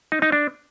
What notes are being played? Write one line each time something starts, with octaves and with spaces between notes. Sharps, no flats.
D#4
D#4
D4